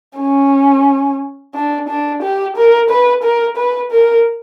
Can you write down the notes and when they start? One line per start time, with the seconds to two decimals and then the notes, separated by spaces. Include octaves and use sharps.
0.19 C#4
1.55 D4
1.89 D4
2.23 G4
2.57 A#4
2.90 B4
3.23 A#4
3.57 B4
3.92 A#4